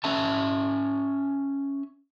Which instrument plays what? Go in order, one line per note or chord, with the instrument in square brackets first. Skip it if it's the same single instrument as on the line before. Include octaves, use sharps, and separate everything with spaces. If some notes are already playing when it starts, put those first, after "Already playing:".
[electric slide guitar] C#4 E5 A5